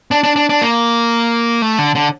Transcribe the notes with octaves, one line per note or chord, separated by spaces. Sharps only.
D4
D4
D4
D4
A#3
A3
D3
D3